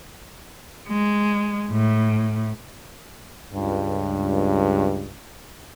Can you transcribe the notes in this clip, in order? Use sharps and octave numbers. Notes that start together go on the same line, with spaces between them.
G#3
A2
C#2 G2